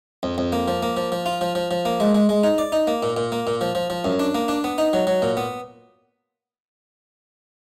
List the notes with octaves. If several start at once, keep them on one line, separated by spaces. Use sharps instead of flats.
F2
F2
A#3
F3
A#3
F3
F3
F4
F3
F3
F3
A#3
G#3
G#3
G#3
D#4
D5
D#4
A#3
A#2
A#2
A#3
A#2
F3
F3
F3
F#2
D4
A#3
D4
B3
D#4
F#3
F#3
A#2
B3